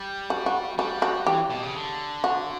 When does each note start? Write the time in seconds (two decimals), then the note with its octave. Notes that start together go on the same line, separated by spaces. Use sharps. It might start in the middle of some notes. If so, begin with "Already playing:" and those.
Already playing: G3
0.30 F#4
0.46 F#4
0.78 G3 F#4
1.02 F#4
1.27 E3 G4
1.50 B2
1.63 C#3
1.74 D3
2.24 F#4